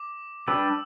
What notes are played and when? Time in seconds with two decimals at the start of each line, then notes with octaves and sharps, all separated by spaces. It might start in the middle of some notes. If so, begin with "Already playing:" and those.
Already playing: D6
0.47 G3 D4 G4 B4 E6